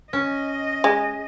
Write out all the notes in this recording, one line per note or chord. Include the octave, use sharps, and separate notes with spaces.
C#4 D#5
G#3